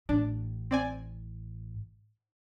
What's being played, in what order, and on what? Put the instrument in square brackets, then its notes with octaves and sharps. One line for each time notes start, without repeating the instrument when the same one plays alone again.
[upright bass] A1 A2 [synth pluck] D4
[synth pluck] C4 D5 G#5